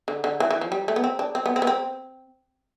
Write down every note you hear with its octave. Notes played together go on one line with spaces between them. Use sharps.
D3
D3
E3
E3
F3
G3
A3
B3
C4
D4
C4
B3
C4
B3
C4